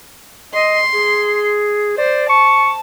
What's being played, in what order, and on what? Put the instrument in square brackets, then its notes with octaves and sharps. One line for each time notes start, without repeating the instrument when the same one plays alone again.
[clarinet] D#5 [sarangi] C6
[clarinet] G#4
[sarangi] C5 [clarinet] D5
[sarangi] A5 [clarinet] C#6